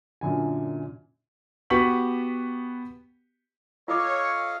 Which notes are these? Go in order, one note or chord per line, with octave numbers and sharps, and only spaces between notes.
F#2 A#2 D3 G#5
B3 F#4 G4 C#6 B6 F#7
F4 A4 C#5 D#5 F5 D6